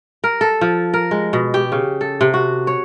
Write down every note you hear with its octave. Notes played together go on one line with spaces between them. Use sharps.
A#4
A4
F3
A#4
G#3
B2
G4
C#3
A4
C3
F#4
C#5